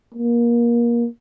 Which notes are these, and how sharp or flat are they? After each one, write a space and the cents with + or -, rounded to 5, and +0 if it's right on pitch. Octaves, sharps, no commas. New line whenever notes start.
A#3 +25